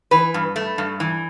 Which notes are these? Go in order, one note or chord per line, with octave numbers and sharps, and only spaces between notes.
E3 B4
G2
A3
G2
E3